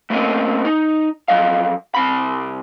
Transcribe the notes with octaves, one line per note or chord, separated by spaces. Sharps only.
A3 A#3 C4 C#4 A#4 D#5
D#4
F2 F#3 D#5 F5
C2 C3 B5